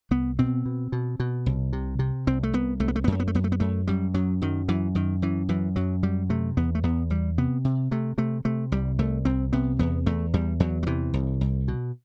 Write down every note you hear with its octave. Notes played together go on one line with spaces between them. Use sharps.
C2 B3
B2 C4
B2
B2
B2
C2
C3
C3
C2 C4
A3
C2 B3
C2 A3
B3
A3
B3
F#2 A3
B3
A3
F#2 B3
A3
B3
F#2 A3
F#2 G3
F#2 F#3
F#2 D#3
F#2 E3
F#2 D#3
F#2 E3
F#2 E3
F#2 F#3
F#2 G3
C3 A3
E2 B3
A3
E2 B3
E2 G3
C3 B3
C3
C3 A3
C3 A3
C3 A3
C2 G3
C2 A3
C2 C4
C3 B3
E2 B3
E2 A3
E2 G3
E2 F#3
F#3
C3 E3
C2
C2
B2